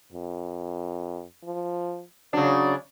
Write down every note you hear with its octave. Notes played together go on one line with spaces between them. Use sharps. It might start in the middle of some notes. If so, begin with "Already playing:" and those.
F2
F3
C#3 F#3 D4